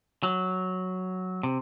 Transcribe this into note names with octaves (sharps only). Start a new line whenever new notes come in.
F#3
C3